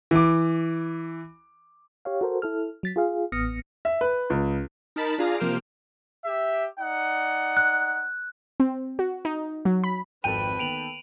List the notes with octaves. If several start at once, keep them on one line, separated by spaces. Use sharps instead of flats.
E3 D6
G4 C#5 F5
F#4 A4 A#4 C5
E4 A4 F6
F#3 A6 B6
F4 G#4 F5
A1 B3 D#6 F6 A#6 C#7
E5
B4
C#2
D#4 A#4 A5 B5
D4 F4 G#4 F5 A#5
C3 F3 A#3 C5 F6 D7
G4 E5
D#4 D5 F#5
F#6
C4
F#4
D#4
F#3
B5
G#1 F2 A4 B4 G5 B5 D#7 F7
D#3 A#3 B3 D7 F7 F#7